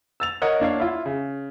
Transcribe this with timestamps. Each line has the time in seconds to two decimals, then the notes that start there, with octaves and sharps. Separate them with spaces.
0.20 E6 A6 F7
0.42 A#4 C#5 D#5 F#5
0.60 A#3 D4 C#5 F5
0.80 E4 F4
1.06 C#3